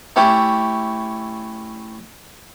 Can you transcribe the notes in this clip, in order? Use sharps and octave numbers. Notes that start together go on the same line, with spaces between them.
A3 C#4 E4 G4